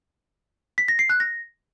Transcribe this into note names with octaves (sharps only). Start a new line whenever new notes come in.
B6
A#6
C7
F#6
A#6